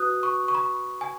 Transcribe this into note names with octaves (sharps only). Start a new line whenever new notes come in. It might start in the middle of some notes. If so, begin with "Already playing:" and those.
Already playing: F#4 B4 D#6 F#6
C#6
C#6
B5
G#5